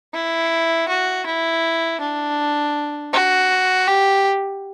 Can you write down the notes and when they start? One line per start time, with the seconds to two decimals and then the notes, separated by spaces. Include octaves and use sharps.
0.14 E4
0.89 F#4
1.26 E4
2.01 D4
3.13 F#4
3.88 G4